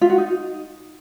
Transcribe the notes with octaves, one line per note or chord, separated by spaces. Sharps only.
F4
F#4
D#4